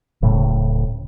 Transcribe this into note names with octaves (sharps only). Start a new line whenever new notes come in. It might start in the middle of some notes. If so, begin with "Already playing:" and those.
D1 A2 C#3 A3